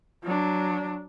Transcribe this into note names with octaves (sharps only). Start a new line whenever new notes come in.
F#3 D4